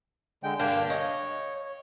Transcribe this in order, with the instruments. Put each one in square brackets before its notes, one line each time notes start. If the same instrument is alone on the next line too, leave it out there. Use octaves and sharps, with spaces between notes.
[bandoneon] D3 G#3 G5
[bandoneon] G2 D4 G5 [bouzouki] D3 A#3 F5
[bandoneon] C#5 [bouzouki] D#5